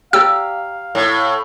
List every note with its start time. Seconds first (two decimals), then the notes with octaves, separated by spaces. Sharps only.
0.13 G4 D5 F5 A#5 E6
0.95 A2